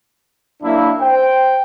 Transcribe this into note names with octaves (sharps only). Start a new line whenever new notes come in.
F#2 A#3 D4 E4
C5 G5